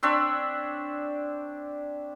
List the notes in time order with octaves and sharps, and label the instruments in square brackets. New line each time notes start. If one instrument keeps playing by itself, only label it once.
[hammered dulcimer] C4 D4 C#5 E5